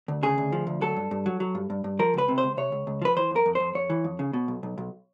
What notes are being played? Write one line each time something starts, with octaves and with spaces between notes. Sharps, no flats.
D2
C#3 G#4
D2
F3
D2
F#3 A4
G2
G2
F#3
F#3
G2
G2
G2
F3 A#4
C#2 B4
C3
C5
C#2
C3 C#5
C#2
C#2
F3 B4
E3 C5
F2 A#4
F2
C5
F2
F2 C#5
E3
F2
C#3
B2
B1
B1
B1